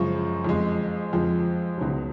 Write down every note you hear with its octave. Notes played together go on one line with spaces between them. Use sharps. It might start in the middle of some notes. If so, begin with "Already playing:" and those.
Already playing: F#2 C#3 F3 G#3 C#6
F2 F3 G#3
F2 F3 G#3
C#2 B2 F#3